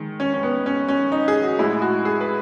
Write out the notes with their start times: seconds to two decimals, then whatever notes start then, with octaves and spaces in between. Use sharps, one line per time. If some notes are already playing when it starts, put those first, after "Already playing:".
Already playing: D#3 G#3
0.20 C#4
0.34 C#4
0.43 B3
0.66 C#4
0.88 C#4
1.12 D#4
1.28 G#4
1.43 F#4
1.59 A2 G#3 E4
1.82 F#4
2.05 G#4
2.20 B4